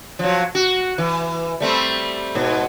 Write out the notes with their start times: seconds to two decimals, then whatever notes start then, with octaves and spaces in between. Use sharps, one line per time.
0.19 F3 F#3
0.55 F#4
0.98 E3
1.60 G3 A3 C4
2.35 G#2 B2